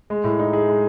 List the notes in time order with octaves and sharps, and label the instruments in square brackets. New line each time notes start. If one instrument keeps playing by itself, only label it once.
[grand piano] G#3
A2
D#4
G#4
G#3